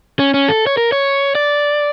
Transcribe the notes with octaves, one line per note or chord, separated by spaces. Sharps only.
C#4
C#4
A4
C#5
A#4
C#5
D5